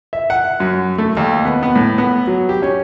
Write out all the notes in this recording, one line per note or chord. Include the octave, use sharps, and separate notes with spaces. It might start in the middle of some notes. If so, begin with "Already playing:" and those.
E5
F#5
F#2
A3
D#2
B3
B3
A2
B3
F#3
G4
C#4